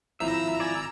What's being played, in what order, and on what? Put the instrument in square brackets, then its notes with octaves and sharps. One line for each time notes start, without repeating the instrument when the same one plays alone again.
[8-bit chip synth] G#1 A#5 E6 [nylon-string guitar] F3 E4 [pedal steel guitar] E5
[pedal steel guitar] D5 G#5